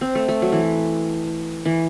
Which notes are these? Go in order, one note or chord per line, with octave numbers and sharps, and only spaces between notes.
C4
A3
A3
F#3
E3
E3